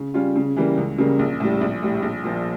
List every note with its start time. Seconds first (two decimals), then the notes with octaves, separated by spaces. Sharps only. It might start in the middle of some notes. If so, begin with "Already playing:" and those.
Already playing: C#3
0.14 G3 C#4 F4
0.36 C#3
0.56 E3 G3 A#3
0.77 C#2
0.98 C#3 G3 A#3
1.19 A#1
1.40 A2 G3
1.61 A#1
1.83 A2 G3
2.03 A#1
2.24 A#2 F3